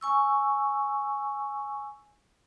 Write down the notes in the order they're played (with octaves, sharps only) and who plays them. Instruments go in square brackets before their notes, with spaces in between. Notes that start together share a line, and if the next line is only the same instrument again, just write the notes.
[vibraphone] G#5 C#6 E6